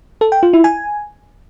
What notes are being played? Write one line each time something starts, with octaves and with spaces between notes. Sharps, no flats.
A4
G5
F4
E4
G#5